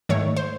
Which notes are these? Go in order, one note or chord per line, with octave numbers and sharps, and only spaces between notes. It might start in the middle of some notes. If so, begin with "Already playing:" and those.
G#2 D#3 A3 C#5
C5